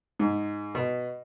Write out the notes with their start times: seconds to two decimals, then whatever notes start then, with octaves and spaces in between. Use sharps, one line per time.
0.19 G#2
0.75 B2